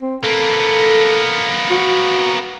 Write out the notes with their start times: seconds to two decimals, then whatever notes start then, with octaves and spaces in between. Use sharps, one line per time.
0.02 C4
0.24 A#3 B3 A4
1.71 F#4